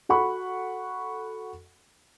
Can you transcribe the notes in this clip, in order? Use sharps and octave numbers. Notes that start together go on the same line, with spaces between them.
F#4 A4 F#5 B5 C#6